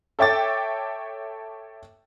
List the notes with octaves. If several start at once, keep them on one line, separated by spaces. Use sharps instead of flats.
A4 C#5 E5 G5 D6 A6